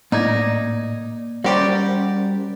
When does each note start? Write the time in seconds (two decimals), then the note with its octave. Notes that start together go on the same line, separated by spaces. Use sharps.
0.12 A2 A#3 D#4 D5 A#5 G#6
1.44 G3 C#4 F#4 G4 A#4 C5 D5